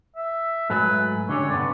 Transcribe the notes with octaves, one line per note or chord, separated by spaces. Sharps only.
E5
G#2 F#3 A3 B4
D3 G3 C#4 C#5
G2 C3 B3 D5